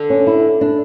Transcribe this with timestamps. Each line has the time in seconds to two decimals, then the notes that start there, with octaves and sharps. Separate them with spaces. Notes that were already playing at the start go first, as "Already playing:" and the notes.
Already playing: D3
0.10 C#4
0.27 E4
0.61 D4